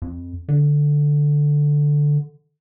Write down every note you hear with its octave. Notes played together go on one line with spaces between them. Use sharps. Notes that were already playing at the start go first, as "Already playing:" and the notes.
F2
D3